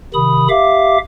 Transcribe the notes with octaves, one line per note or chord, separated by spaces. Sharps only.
C3 D#3 B5 D#6
G4 E5 F5 D6